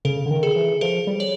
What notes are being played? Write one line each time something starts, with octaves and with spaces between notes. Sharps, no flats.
C#3 A4
D3
D#3
G#4
E3
F3 A4
G3
C#5